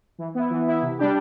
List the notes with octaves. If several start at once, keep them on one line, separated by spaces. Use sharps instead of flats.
E3
B3 E4
E3
B3 E4
C3
G3 D4 G4